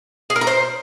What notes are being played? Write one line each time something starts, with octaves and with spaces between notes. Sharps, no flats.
G#4
A#4
A#5
C5